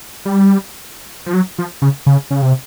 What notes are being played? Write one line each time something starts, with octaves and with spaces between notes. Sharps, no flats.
G3
F3
F#3
F3
C#3
C#3
C#3
C3